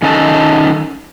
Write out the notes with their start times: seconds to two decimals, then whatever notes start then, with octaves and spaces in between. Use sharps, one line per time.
0.02 D#3 C#4 D#4 A4 A5